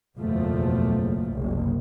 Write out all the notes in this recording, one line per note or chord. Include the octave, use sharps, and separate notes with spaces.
F#1 B1 E2 B2 F3 A3
F#1 C2